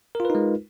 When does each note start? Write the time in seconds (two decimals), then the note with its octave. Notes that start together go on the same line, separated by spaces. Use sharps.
0.15 A#4
0.20 F4
0.25 B4
0.30 D#4
0.35 G#3